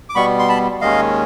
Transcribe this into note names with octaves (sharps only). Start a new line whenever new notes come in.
D6
B2 G3 B3 B5 C#6
C6
A5 B5
D#2 D#3 G#3 C#4 D#5 F5